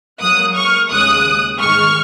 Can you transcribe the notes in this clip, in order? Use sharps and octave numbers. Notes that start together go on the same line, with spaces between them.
G#2 F#3 A#3 D#6 F#6
C#6 F6
D#2 C#3 G#3 D#6 F#6
G#2 D#3 G#3 C#6 F6